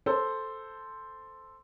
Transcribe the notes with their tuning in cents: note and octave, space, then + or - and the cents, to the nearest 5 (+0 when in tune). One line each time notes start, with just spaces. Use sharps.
A4 +0 C5 +0